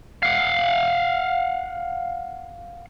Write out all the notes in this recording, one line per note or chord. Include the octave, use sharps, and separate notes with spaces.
F5 F#5